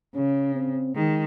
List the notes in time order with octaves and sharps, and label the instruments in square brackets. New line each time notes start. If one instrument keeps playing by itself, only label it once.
[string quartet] C#3 [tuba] C#4
[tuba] C4
[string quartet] D#3 [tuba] G#3